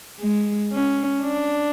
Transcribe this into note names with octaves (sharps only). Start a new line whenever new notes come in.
G#3
C#4
D4